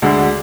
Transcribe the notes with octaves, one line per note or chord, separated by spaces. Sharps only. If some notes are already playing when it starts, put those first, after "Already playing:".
D2 D3 G#3 D4 F#4